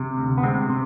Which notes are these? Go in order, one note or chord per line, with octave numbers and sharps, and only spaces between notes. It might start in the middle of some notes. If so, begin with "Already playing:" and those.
Already playing: C3
D2
B3
C3 G#3 C4
C3